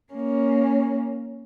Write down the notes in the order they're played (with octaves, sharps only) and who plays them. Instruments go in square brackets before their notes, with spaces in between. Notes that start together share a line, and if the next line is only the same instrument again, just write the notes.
[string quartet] A#3 C#4